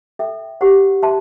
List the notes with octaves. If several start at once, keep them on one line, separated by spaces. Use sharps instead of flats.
A4 E5 G5
G4 C5 F#5
C5 E5 A5 C6